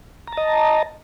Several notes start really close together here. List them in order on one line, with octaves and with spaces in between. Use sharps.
A#5 A5 D#5